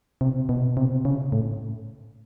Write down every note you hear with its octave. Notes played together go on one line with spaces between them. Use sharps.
C3
B2
C3
C#3
A2